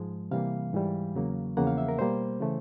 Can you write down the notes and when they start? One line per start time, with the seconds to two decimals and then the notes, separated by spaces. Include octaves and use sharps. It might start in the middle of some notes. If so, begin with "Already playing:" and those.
Already playing: G#2 F3 G#3
0.31 C3 E3 G3 A#3 F5
0.73 G#2 E3 G3
1.15 E2 C#3 F#3 A#3
1.57 E2 C#3 F3 A#3 F#5
1.67 F5
1.78 E5
1.88 A#4
1.99 B2 G3 A#3 C5
2.41 C#3 E3 A3